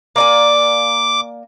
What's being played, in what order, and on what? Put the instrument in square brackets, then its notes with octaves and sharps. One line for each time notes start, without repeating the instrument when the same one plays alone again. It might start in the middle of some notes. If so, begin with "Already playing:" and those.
[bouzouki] A#3 D5 G#5 [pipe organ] D6